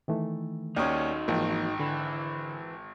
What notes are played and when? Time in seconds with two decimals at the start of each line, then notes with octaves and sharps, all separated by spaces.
0.08 D#3 E3 A3
0.76 D#2 C#4 D#4 F#4 D5 D#6
1.28 G#1 E3 F3 A#3
1.80 D3 E3